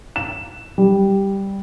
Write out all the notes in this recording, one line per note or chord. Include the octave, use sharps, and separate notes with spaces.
E7
G3